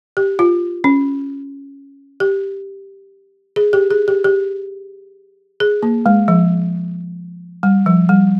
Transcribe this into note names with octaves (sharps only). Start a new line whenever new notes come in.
G4
F4
C#4
G4
G#4
G4
G#4
G4
G4
G#4
A#3
G#3
F3
G3
F3
G3